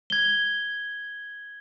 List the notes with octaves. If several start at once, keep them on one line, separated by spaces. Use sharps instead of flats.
G#6 G7